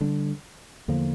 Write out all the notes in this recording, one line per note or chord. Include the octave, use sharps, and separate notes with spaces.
D3 G3 D4
E2 D3 F3 A#3